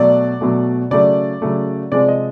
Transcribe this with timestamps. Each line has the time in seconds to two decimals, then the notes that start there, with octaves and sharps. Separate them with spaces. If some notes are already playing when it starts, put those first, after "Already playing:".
Already playing: B2 F#3 A3 D5
0.41 B2 F#3 A3
0.91 C#3 F#3 A3 D5
1.42 C#3 F#3 A3
1.92 C3 F3 G#3 D5
2.08 D#5